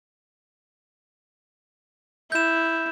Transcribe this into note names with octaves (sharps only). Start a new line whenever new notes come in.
E4 G6 E7